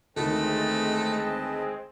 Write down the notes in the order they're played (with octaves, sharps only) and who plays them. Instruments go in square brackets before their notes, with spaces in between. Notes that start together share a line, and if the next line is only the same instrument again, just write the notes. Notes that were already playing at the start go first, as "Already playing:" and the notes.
[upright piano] D2 D#3 [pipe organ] G#3 C4 [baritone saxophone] A3 [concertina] B4 D#5 A5